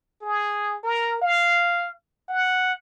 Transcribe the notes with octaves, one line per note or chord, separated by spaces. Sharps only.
G#4
A#4
F5
F#5